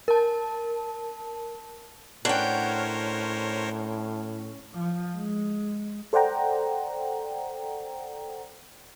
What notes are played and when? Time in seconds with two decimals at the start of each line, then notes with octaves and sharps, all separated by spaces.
0.08 A#4 A5
2.25 A2 C#4 D4 A#4 C5 C#5 F#5 G5
4.75 F3
5.16 G#3
6.13 A4 C5 D5 F#5 G5 A#5